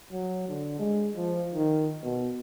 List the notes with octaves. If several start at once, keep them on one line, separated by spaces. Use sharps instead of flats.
F#3
D3
G#3
F3
D#3
B2